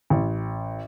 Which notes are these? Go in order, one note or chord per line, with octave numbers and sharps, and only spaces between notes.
A1